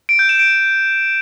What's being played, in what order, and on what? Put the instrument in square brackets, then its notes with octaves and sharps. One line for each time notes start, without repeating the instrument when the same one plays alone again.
[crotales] D7
G6
E7
D7